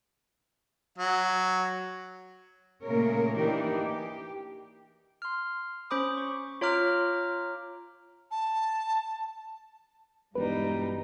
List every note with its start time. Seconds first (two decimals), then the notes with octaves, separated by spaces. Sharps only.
0.98 F#3 F#5
2.84 A#2 C#3 A3 A#3 A#4 C#5
3.38 E3 A#3 D4 D#4 G4 A#4
3.84 G4
5.22 C6 F6
5.90 C#4 C5 B5 D6 D#6
6.17 C#6
6.61 F4 C#5 A#5 D6 F6
8.31 A5
10.35 E1 G2 G3 D#4 B4